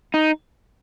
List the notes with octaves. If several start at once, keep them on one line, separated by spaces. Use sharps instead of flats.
D#4